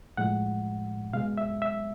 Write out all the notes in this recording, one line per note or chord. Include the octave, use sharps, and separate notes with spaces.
A2 F3 G#3 F#5
B2 G#3 F5
E5
E5